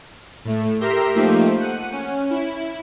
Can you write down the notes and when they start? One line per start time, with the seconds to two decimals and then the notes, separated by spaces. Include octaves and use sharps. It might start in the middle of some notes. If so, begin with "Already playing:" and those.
0.45 A2 A3
0.80 G4 A#4 E5 A#5 C6
1.15 F3 A3 A#3 D#4 G4 C5
1.60 F#5 D#7
1.92 C#4
2.30 E4